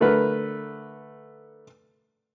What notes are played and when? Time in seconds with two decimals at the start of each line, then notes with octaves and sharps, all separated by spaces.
0.01 D3 A3 A#4 B4